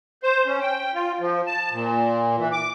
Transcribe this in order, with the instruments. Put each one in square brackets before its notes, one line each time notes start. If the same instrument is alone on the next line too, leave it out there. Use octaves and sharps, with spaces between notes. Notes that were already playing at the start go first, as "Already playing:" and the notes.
[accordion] C5
C#4
G5
F4
F3
A5
A#2
E3
D6